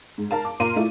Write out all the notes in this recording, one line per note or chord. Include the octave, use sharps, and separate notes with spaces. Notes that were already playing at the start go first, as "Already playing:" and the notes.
G#2
A#4 F5 A5
D6
A#2 A#4 F5 C6 D#7
A3 E4 F4